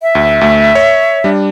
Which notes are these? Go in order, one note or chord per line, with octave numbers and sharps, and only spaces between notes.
E5
D2
D2 A3
C#5
G3 D4